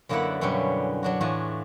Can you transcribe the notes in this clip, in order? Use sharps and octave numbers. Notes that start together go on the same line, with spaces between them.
F#2 D3 A#3 B3 E4 F#5
F#2 B2 D3 G3 C#4
F#3 D4 F#4
E2 A2 D4 F4 F#4 G#5